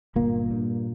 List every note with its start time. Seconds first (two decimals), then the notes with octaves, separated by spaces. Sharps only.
0.16 G1 A#2 A#3
0.51 G2